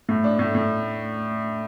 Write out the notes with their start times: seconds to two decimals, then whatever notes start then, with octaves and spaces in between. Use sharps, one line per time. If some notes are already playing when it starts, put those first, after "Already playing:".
0.09 A2 A3
0.24 D4
0.39 A2
0.55 A2